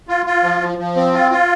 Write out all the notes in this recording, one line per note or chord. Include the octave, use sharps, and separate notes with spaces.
F4
F4
F3
F3
F3
C4
F4
F4